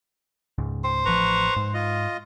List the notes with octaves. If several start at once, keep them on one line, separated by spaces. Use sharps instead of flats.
C#2 G#2 C#3
C5
A1 F3 B4 A#5 C#6
G#2
F4 D#5